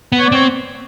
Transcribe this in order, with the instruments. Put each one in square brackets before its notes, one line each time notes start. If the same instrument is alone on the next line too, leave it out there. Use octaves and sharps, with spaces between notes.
[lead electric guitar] B3
[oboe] C#5
D5
[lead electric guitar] C4 [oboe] C#5